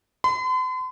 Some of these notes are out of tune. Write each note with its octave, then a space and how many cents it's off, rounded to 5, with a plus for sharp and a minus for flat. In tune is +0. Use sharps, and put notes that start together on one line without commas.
C6 -45